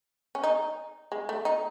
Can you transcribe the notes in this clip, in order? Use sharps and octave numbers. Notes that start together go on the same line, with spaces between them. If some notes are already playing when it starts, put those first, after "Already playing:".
C#4
D#4
G#3
A3
D#4